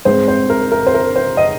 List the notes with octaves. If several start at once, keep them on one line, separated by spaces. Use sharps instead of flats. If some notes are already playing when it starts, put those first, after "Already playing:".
G#2 G#3 C4 C5
C5
A#4
A#4
C5
A#4
C5
D#5